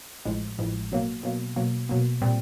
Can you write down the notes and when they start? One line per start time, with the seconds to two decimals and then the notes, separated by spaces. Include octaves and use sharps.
0.25 A1 A2 F3 G#3
0.58 A1 A2 F3 G#3
0.92 B2 F#3 A#3
1.23 B2 F#3 A#3
1.56 B2 F#3 A#3
1.89 B2 F#3 A#3
2.22 A#2 G3 C4